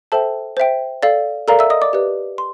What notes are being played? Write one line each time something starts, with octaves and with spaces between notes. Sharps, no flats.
A4 C5 E5 G5 A5
C5 E5 G5
A4 D5 F5
A4 A#4 D5 F5 A#5
E5 E6
D#5 D#6
D5 D6
G4 B4 D5
C6